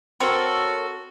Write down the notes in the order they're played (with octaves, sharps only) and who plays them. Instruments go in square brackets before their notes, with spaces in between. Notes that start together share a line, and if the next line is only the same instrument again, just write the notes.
[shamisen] C4 [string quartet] F#4 [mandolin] A4 A#4 C#5